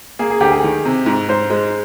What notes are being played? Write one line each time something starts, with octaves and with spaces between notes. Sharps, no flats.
A#3 G#4
G#4
D2 G4
G#4
D#3
C3
G#2
G#2 C5
G#3 C5